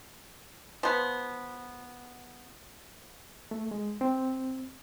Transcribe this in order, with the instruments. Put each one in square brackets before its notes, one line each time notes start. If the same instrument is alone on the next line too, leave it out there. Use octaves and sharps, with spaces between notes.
[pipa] F3 B3
[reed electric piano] A3
G#3
C4